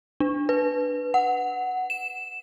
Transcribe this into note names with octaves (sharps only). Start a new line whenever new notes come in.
D4
B4
F#5
E7